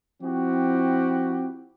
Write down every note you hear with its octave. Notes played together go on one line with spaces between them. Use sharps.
F3 C4 E4 F#4 G4